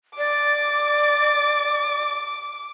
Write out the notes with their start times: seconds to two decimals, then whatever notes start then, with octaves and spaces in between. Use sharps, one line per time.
0.18 D5 D6